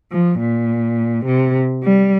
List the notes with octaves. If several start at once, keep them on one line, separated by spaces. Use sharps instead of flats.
F3
A#2
C3
G3